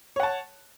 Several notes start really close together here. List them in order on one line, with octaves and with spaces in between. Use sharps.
C#5 F#5 A5